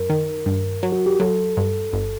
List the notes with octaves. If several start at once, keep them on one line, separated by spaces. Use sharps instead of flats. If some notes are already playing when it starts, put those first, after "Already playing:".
Already playing: F#2 A#4
D#3
G2
F#3
F#4
G4
F#3 A4
G2
G1